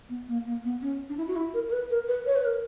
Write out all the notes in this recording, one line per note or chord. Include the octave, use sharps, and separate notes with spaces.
B3
A#3
A#3
B3
C#4
D4
E4
F#4
E4
A#4
A#4
B4
A#4
B4
C#5
B4
A#4